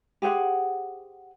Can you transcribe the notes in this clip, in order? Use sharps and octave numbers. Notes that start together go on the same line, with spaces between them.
G4 G#4 C5 F#5